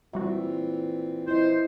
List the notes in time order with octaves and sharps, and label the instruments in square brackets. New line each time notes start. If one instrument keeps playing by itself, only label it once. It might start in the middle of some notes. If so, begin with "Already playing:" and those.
[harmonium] A#2 E3 C4 [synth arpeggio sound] F#3 G3 F#4 [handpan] E5
[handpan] E4 D#5 [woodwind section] C5